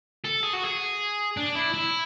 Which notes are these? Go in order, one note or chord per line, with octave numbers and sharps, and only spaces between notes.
A4
G#4
F#4
G#4
D4
E4
E4